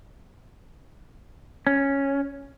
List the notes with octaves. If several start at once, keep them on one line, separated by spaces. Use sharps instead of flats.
C#4